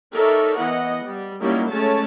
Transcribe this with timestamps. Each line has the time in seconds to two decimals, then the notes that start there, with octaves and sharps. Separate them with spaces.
0.14 D#4 A4 A#4 C#5 D5 E5
0.57 E3 B3 D#5 F#5
1.04 G3
1.41 F#3 G3 A#3 C#4 D#4 E4
1.70 G#3 A3 C#4 C#5 A5